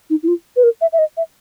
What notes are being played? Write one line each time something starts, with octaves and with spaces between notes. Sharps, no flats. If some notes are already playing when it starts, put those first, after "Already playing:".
D#4
E4
F4
B4
A#4
E5
E5
D#5
E5